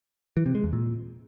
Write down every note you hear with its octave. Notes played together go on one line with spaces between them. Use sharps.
E3
C3
G#3
E2
A#2